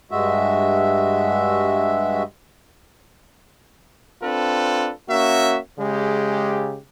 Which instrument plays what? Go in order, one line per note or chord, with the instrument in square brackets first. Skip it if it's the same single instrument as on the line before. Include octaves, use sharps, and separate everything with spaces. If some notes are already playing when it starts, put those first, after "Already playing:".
[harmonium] G2 G#3 F#4 E5
[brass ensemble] C4 D4 F4 A4 B4
A#3 C#4 F#4 E5
C#3 G#3 G4